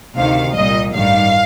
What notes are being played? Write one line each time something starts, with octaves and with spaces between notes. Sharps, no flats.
D2 C3 D#3 F5
C2 A#2 G3 D#5
A1 G2 D#3 G3 F5